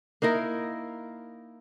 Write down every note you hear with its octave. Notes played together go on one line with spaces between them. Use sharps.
A#3 D#4 E4 A#4